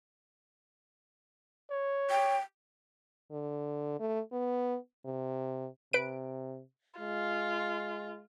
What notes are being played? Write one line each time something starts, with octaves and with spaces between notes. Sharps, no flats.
C#5
G5
D3
A3
B3
C3
C3 B4 D7
G#3 F4